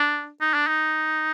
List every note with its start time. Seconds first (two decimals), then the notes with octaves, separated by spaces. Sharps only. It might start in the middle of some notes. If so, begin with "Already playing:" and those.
Already playing: D4
0.41 D#4
0.54 D4
0.67 D#4